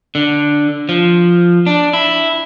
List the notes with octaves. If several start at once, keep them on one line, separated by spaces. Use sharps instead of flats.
D3
F3
D4
E4